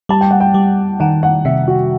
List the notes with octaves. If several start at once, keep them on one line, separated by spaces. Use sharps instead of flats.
G3 A5
G5
F#5
G5
G3
D#3 F#5
F#5
C3 E5
F#4